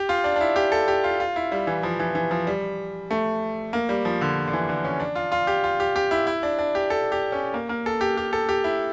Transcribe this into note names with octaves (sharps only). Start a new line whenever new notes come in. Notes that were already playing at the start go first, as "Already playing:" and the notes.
Already playing: G4
F4
D4
D4
E4
G4
A4
G4
F4
F4
E4
G3
E3
F3
E3
E3
F3
G3
A3
A#3
G3
F3
D3
D3
E3
D3
C#4
D4
F4
F4
G4
F4
G4
G4
E4
E4
D4
D4
G4
A4
G4
C#4
A#3
A#3
A4
G4
G4
A4
G4
E4